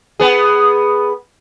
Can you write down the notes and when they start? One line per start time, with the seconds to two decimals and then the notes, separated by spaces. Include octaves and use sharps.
0.20 B3 G#4